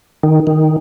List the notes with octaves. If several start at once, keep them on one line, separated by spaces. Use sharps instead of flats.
D#3
D#3